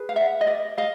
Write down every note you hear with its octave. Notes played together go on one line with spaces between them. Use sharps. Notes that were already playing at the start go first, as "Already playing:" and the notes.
Already playing: G#4 B4
F5
E5 F#5
D#5
D5 E5
D#5 F5